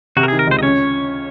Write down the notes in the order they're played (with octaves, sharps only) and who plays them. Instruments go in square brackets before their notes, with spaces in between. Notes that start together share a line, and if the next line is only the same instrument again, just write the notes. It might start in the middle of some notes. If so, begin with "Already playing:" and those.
[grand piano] C3 [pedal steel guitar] F#4
[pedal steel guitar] A#4
G#4
[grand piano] D#3
[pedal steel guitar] A#4
[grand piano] C#2 [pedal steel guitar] C5
[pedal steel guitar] D#5
[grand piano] C#4 [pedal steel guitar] C#5